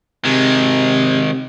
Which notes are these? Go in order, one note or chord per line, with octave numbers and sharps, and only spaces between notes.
C3 D#3 G#3